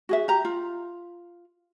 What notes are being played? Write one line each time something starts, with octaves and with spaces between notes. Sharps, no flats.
F#4 G#4 E5
G4 A#5
F4